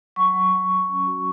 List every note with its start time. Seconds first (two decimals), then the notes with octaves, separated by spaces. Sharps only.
0.16 F#3 C#6
0.33 F#3
0.51 F#3
0.70 F#3
0.89 C#4
1.05 F#4